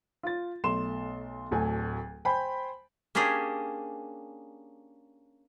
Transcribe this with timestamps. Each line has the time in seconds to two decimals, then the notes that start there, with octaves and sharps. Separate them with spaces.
0.23 F4 A6
0.64 B1 A3 C6 E7
1.51 D1 D2 A4 G#5
2.25 C5 G5 G#5 B5 C6
3.15 A#3 C#4 D4 G4 G#4